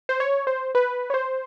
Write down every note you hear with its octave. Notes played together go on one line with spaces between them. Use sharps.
C5
C#5
C5
B4
C#5
C5